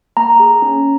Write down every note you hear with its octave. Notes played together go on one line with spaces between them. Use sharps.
A#3 A#5
G#4
C#4